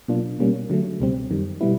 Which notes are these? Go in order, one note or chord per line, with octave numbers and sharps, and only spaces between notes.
B2 F#3 A#3 D4 F4
B2 G3 A#3 C#4
D3 F#3 A3
C#2 B2 G3 C4
F#2 D#3 G3
B2 G3 B3 E4